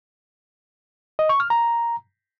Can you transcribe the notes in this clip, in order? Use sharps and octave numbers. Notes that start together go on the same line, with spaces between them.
D#5
C#6
F6
A#5